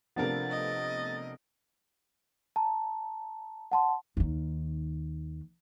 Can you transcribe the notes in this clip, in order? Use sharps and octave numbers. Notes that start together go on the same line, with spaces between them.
C3 F3 A3 B3 D4 A#4 A6
D#5
A5 A#5
F#5 A5 C6
D#2 D#3